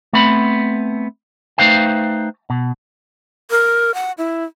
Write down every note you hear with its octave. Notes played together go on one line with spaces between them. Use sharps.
A3 B3 C4 B5
A3 D#4 B4 C5 F5 G5
B2
A#4
F#5
E4